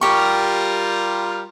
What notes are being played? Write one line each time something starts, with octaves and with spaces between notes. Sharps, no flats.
G3 F4 G4 A#4 C#6